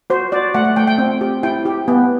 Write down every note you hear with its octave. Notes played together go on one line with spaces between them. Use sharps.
F#4 C5
F#4 D5
A3 F#5
F#5
A3 G5
G5
C4
G4
E4 G5
G4
B3